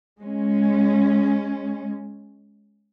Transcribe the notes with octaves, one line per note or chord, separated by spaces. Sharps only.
G#3 C#4